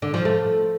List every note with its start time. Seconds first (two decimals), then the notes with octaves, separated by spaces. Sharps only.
0.02 D3
0.14 F3
0.25 A3